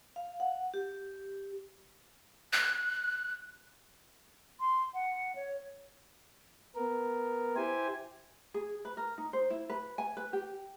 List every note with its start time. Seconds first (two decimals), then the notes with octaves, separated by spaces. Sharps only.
0.16 F5
0.40 F#5
0.74 G4
2.53 F#6
4.60 C6
4.94 F#5
5.35 C#5
6.76 B3 A#4
7.56 E4 G4 C5 G#5
8.54 G#4
8.85 B4
8.97 A#4
9.18 D#4
9.33 C5
9.50 E4
9.70 B4
9.98 G#5
10.17 B4
10.33 G4